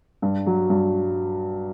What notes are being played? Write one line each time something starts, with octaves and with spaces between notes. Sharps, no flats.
G2
F#3
G2